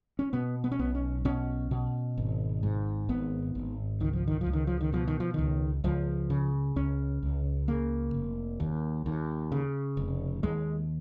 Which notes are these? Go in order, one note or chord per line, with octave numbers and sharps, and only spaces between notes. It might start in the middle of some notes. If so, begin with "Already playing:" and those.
C#4
B2 B3
B3
C#4
B1 B3
C#4
B2 C#4
B2
G#1
G#2
G#1 B3
G#1
C#2 D#3
F3
D#3
F3
C#2
D#3
F3
D#3
B2 F3
D#3
F3
C#2 D#3
C#2 F3
C#3
C#2 C#4
C#2
C#3 A#3
F1
D#2
D#2
C#3
F1
D#2 G#3